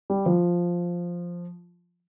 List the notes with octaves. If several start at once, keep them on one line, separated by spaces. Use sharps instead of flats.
G3
F3